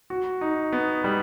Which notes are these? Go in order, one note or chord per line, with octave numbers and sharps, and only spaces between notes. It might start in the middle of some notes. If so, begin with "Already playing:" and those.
F#4
D#4
B3
G3